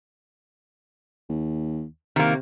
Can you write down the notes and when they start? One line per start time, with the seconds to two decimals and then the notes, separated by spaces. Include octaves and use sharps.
1.29 D#2
2.16 C3 D#3 A#3